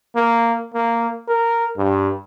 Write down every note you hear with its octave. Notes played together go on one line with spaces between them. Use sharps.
A#3
A#3
A#4
G2